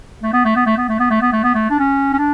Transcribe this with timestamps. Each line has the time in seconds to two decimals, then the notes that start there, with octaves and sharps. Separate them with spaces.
0.23 A3
0.33 B3
0.45 A3
0.56 B3
0.66 A3
0.78 B3
0.89 A3
0.99 B3
1.10 A3
1.21 B3
1.33 A3
1.44 B3
1.54 A3
1.70 D4
1.79 C#4
2.13 C#4
2.18 D4